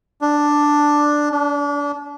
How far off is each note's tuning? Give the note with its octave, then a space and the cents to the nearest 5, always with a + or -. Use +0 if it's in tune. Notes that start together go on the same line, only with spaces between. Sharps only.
D4 +5
D4 -30